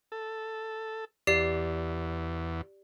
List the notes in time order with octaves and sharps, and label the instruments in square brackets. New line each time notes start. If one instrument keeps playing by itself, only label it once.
[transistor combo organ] A4
[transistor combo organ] E2 [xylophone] G4 D5 C7